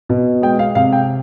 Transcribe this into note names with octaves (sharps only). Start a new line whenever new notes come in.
B2
G#3 G5
F5
C3 F5
G5